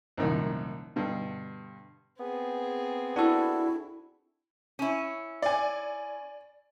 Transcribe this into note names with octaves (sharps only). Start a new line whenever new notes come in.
C2 F#2 A#2 D#3 F3
G2 B2 D3
B3 C4 G#4
D4 E4 F#4 A4
C#4 E4
D5 G#5